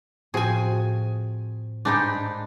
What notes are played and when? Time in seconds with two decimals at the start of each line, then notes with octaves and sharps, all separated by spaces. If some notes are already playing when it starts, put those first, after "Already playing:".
0.34 A2 F3 C4 F#4 G#4 G#5
1.85 G#2 G#3 D4 D#4 G4 B4